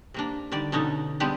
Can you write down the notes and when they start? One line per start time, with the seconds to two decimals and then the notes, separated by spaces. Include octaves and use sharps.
0.14 C3 A#3 D4
0.52 D3 D#3 G3 D5
0.72 B2 D3 C#4 D#4 A4
1.20 G3 G#3 B3 C4 D4 G4